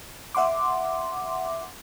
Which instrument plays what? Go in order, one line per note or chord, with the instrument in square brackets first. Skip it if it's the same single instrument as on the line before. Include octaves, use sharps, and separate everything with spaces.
[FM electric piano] E5 F#5 C6 D6